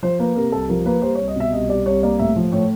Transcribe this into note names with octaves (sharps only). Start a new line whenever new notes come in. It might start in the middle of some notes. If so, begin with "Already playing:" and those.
F3 C5
A#3 B4
C3 A#4
C2 A4
F3 A#4
A#3 B4
G3 C5
C#5
C2
D#5
B2 E5
C2 D#5
G3 D5
C2 C#5
A#3 D5
A2 E5
F3
A2 C#5